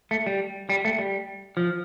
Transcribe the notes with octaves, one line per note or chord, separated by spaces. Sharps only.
A3
G3
G3
A3
G3
F3